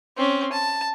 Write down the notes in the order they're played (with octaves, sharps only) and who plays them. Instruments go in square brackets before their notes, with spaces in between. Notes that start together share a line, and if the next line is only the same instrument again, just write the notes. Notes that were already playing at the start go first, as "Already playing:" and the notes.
[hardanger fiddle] C4 C#4
A5